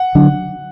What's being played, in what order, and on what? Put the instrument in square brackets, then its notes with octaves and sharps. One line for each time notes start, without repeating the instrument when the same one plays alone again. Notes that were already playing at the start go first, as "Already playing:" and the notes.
Already playing: [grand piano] F#5
[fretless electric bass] D3 F#3 D4